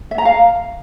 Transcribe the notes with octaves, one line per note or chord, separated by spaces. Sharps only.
E5
A#5
F5